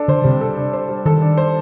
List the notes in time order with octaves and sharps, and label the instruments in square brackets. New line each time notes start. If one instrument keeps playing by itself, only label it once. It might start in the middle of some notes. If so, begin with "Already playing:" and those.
Already playing: [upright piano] D4 A4
[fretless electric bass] D3 [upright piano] C5
[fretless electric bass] C3 [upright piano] G3
[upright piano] A4
D4
C5
G3
[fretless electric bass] D#3 [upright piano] A4
[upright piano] D4
C5